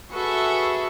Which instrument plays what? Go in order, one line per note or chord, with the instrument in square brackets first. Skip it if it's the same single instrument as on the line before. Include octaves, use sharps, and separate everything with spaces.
[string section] F#4 G#4 A4 B4 E5 C#6